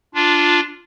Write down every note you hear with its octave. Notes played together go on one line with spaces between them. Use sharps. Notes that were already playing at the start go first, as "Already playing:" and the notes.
D4 F4